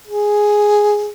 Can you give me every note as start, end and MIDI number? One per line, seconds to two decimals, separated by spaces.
0.07 1.11 68